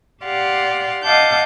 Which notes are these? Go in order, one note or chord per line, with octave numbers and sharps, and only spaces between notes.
G4 D5 F5 F#5 C6
D#5 F5 F#5 A5 D6 G6